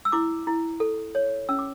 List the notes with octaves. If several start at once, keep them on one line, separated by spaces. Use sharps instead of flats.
E6
E4 D6
E4
A4
C#5
C#4 E6
D6